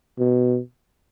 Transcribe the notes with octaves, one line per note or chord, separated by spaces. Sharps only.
B2